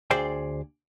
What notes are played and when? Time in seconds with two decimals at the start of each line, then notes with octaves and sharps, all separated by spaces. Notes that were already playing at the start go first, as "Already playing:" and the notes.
0.11 D2 G#4 C5 D5 G5